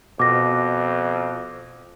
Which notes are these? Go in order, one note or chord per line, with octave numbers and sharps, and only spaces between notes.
F2 B2 D6 A#6